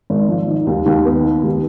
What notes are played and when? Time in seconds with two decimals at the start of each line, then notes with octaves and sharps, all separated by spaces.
0.10 G#1
0.29 F3
0.48 D#3
0.67 D#2
0.86 D#2
1.05 B3
1.24 D#3
1.44 D#2